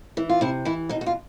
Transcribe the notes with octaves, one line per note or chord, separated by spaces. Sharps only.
E3
F4
C3 E4
E3 E4
B2 D#4
F#4
F4